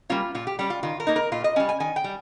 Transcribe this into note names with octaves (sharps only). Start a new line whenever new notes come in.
G3 A#3 C#4 F4
A#2 F4
G4
G3 C#4 G4
F4
D#3 F4
A#4
A#3 D#4
A#4
A#2 F4
D#5
G3 C#4 G#5
G#5
D#3 G#5
G5
G3